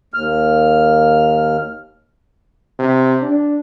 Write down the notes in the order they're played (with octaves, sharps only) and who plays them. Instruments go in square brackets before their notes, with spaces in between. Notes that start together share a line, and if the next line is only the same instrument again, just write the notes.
[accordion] D#2 F6
[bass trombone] C3
D4